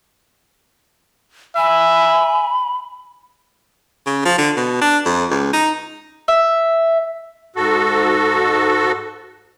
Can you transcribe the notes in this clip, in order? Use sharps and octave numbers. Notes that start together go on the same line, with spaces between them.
E5 G#5 B5
C#3
F3
D3
B2
D4
F2
C#2
D#4
E5
G#2 F#4 A4